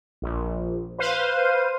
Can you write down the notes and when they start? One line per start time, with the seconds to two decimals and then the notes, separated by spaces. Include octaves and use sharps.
0.22 A#1
0.98 B4 C5 F5 D#7